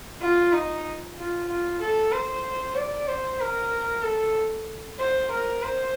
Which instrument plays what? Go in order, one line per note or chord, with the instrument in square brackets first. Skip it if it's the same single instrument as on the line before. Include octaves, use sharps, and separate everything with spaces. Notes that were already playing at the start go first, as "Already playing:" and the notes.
[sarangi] F4
D#4
F4
F4
A4
C5
D5
C5
A#4
A4
C5
A#4
C5